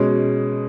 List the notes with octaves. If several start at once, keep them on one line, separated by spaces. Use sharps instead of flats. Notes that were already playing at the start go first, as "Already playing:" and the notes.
Already playing: B2 G#3 C#4